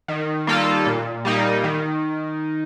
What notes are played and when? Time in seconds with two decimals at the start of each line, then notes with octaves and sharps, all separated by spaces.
0.08 D#3
0.47 G3 A#3 F4 A4
0.86 A#2
1.25 G3 A#3 D#4
1.64 D#3